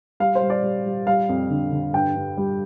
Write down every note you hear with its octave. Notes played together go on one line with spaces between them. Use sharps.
G3 F5
C5
G3
D5
G3
G3
G3 F5
F2
D3
D3
G2 G5
G2
G3